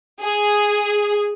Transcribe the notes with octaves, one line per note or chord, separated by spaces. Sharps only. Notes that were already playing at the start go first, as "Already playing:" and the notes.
G#4